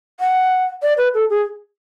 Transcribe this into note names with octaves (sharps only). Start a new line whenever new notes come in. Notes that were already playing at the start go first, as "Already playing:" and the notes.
F#5
D5
B4
A4
G#4